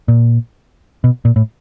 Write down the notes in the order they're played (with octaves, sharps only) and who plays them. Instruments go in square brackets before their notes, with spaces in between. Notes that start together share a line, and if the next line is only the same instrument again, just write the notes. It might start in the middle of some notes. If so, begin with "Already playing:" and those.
[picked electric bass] A#2
B2
A#2
A2